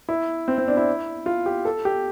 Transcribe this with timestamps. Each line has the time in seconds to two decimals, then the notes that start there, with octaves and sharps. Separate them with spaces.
0.09 E4
0.48 C4
0.58 C4
0.68 D4
0.77 E4
1.26 F4
1.46 G4
1.65 A4
1.85 G4